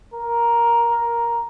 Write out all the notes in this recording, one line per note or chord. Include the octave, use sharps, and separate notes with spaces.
A#4
A#4